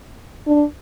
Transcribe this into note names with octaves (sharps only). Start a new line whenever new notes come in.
D4